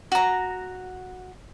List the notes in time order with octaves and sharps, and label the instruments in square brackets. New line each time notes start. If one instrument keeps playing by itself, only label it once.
[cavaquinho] F#4 A#5